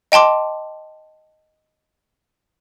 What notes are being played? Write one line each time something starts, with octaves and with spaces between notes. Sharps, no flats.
D#5 G5 A5 C6 D6